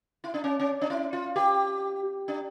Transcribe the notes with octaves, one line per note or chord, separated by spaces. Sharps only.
E4
D4
C#4
C#4
D4
E4
F4
G4
D4